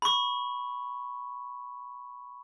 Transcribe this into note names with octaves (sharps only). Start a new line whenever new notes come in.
B5 C#6